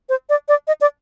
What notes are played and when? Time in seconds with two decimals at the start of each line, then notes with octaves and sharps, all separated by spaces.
0.09 C5
0.29 D5
0.48 D5
0.67 D#5
0.81 D5